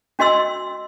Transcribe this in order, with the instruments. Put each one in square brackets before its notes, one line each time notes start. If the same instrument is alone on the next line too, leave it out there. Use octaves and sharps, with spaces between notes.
[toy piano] C#4 F#4 D#5 C6 E6